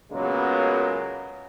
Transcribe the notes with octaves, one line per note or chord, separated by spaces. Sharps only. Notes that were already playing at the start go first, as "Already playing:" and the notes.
A#2 C#3 F#3 G#3 A#3 B3